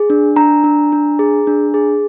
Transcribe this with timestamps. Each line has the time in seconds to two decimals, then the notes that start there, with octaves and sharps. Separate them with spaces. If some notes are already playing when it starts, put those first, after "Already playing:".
Already playing: G#4
0.10 D4
0.36 D4 A#5
0.64 D4
0.92 D4
1.19 G#4
1.47 D4
1.74 G#4